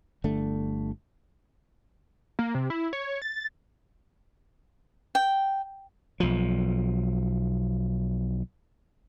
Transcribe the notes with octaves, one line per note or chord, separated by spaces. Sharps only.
G1 D3 A3
A#3
C3
E4
C#5
A6
G5
B1 F3